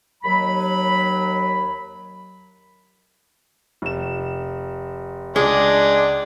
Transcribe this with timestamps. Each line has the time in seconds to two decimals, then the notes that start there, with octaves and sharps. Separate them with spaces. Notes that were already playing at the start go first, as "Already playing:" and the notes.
0.24 D#2 F#3 B5
3.82 F1 E7
5.36 C#2 G#3 D4 G#4